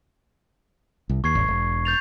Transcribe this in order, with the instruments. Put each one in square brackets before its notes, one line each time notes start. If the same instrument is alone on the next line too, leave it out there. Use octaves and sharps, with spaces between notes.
[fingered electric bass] C2
[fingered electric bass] D#2 [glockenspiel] C#6 G#6 C7
[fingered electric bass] D#1 G#1
E1
[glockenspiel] G6 A6 F7